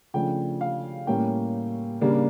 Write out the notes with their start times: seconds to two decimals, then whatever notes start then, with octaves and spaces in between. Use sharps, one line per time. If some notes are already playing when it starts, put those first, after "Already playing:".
0.14 C#3 F3 A3 D4 G5
0.61 F5
1.07 A2 G3 A#3 C#4 G5
2.01 C#3 G3 A#3 D4